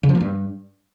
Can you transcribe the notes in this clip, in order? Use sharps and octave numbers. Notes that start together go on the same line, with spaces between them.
C#3
F3
A#3
G2